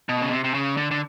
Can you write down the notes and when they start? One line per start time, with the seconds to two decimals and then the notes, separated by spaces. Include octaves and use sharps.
0.09 B2
0.22 C#3
0.31 C3
0.44 C3
0.54 C#3
0.77 D3
0.91 D3